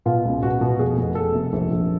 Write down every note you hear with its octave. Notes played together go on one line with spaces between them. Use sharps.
B2 F4
C#2
B2 F#4
B2
F1 G#4
F1
F1 A4
C3
A#1
A#1